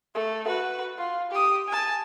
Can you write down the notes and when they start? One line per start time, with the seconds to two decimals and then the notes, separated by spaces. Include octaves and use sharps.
0.14 A3
0.46 F#4 B4
0.97 F4
1.31 G4 D#6
1.68 G#5 A5